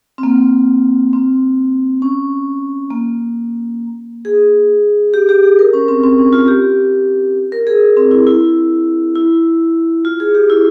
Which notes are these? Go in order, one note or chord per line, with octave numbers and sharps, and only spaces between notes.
C4
A#3
C4
C#4
A#3
G#4
G4
G4
G#4
A#4
C#4
C4
C4
C#4
F4
G4
A#4
G#4
C4
E4
E4
E4
F4
G#4
G4
E4